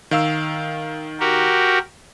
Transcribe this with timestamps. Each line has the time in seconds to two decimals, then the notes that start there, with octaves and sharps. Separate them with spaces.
0.11 D#3 F5 E6
1.20 F#4 G4 A#4